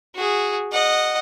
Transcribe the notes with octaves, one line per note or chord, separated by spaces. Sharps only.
F#4 G#4
D#5 F#5